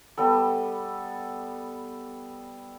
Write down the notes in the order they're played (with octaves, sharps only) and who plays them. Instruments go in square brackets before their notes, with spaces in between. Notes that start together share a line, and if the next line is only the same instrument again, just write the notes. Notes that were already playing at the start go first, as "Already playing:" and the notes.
[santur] G3 B3 A4